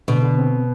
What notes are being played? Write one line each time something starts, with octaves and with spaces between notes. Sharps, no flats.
B2 D3
D3
C4